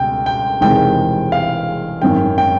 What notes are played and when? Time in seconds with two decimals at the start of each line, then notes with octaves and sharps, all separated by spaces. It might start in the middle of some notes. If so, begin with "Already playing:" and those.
Already playing: C#2 B2 G5
0.26 G5
0.61 E1 E2 C3 D#3 G#3 G5
1.32 F5
2.02 G#1 F#2 D#3 G5
2.38 G5